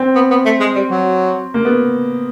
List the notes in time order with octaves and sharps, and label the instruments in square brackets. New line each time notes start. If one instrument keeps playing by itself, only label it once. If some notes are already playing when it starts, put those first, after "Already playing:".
Already playing: [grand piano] C4
[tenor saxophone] B3
B3
A3
G#3
G3
F#3
[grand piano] A#3
B3